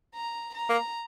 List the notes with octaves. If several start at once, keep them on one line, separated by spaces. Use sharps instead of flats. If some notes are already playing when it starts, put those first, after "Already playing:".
A#5
A#5
A#3